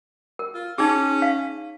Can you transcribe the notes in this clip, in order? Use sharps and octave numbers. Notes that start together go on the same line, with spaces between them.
A#4
F4
C#4 D#4 G#4
F5